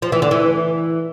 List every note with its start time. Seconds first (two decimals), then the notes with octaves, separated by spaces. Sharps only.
0.02 F3
0.12 E3
0.22 D3
0.31 E3